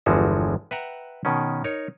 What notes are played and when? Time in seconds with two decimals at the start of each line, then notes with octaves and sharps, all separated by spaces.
0.06 G1 E2 E3 F3 G#3 F#4
0.71 B4 E5 F#5 G5 A#5
1.25 B2 D#3 C#4
1.64 D#4 A#4 C#5